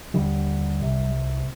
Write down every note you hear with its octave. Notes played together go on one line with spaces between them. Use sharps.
D#2 D3 G3
C2 C3